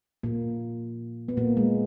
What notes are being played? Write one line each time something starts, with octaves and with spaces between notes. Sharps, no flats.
A#2 A#3
B3
A#2 A#3
G#3